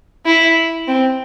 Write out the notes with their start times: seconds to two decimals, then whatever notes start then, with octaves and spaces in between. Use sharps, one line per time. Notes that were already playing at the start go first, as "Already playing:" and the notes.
0.26 E4
0.88 C4